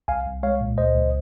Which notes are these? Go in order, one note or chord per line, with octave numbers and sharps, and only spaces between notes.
C2 F5 G#5
C2
G#3 C#5 F5
A#2
C#2 C5 D#5
C#2